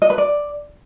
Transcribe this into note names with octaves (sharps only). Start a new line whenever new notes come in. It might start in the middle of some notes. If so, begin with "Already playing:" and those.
D#5
B4
D5